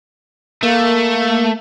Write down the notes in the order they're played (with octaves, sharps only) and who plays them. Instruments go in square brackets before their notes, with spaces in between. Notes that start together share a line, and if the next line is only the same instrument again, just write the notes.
[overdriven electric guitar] A3 [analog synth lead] A#3